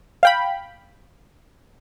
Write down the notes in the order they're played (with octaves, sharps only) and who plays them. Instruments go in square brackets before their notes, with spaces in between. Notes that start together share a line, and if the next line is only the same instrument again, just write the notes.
[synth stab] F5 G5 B5